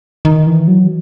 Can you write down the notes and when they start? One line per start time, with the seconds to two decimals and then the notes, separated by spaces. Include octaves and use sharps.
0.25 D#3
0.47 E3
0.68 F#3